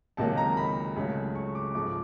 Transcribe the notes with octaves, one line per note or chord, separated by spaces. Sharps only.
C#2 C3 D#3 F#3 A#3 A5
A#5
B5
C#2 C#3 F#3 A3
C#6
D6
G#2 F3 G#3 D6